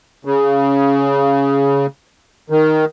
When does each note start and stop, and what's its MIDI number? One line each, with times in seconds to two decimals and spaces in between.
0.25 1.86 49
2.50 2.85 51